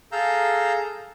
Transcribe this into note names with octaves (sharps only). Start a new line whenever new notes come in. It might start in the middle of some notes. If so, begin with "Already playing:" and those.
G#4 A4 F5 A#5 E6 G6